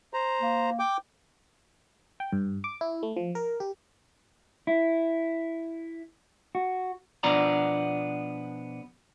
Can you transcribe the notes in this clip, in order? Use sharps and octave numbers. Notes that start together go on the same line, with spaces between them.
C5 A#5
A#3
G5 D6
G5
G2
D6
E4
A3
F3
A#4
G4
E4
F#4
B2 F3 B3 D4 D5 A#5